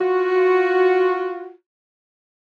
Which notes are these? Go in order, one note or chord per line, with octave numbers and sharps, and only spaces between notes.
F4 F#4